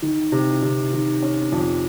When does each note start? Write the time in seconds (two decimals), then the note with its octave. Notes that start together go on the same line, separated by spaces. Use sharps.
0.02 D#3
0.32 C3
0.62 C3
0.93 D#3
1.22 C#4
1.52 F2